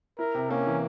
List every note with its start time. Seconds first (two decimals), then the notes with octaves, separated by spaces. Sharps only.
0.18 E4 A#4
0.35 C3
0.50 A#3 C#4
0.67 E3